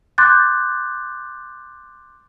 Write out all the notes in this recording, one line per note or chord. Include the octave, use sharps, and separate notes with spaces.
C6 D6 F#6 G6 A6